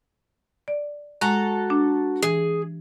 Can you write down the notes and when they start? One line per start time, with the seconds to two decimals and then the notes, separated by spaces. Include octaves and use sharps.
0.68 D5
1.21 G#3 F#4 A4 A#5
1.70 D4
2.23 E3 G#4